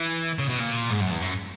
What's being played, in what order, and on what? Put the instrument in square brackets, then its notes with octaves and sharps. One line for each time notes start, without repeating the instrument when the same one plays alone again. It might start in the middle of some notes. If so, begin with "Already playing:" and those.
Already playing: [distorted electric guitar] E3
C#3
B2
A#2
G#2
F#2
E2
F#2